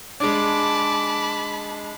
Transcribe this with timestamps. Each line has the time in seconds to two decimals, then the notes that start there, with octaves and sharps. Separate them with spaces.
0.20 G#3 D4 A5 B5 D6